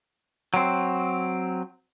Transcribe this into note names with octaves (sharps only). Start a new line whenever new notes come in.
F#3 C4